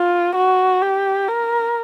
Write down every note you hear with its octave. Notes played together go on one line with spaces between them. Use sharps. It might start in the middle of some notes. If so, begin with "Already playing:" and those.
Already playing: F4
F#4
G4
A#4